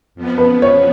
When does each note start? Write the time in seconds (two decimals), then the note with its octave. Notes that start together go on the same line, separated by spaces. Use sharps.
0.15 F2 F3 B3
0.38 B4
0.62 C#5